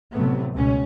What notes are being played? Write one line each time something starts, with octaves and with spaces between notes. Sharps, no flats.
A1 C3 F#3 A3 B3
C#2 B2 C#4